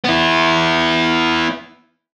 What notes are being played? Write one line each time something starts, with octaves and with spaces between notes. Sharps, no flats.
B3 E4